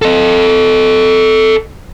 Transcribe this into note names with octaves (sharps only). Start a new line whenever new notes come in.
A4 D#5